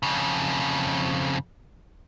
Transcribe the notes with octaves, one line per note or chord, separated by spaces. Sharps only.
F2 C#3